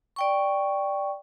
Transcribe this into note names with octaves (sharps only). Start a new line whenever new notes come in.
D5 G5 C#6